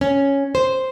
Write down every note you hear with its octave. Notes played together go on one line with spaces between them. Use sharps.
C#4
C5